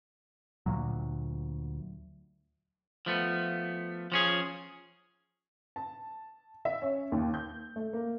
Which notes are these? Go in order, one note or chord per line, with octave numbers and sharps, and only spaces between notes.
D2 A#2 F#3
F3 A3 B3
F3 C#4 G#4
A5
E5
C#4
D#2
G6
A3
A#3